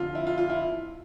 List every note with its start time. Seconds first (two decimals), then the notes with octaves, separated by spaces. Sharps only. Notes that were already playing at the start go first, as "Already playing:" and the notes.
Already playing: F2 D3 F3 F4
0.15 E4
0.27 F4
0.38 F4
0.50 E4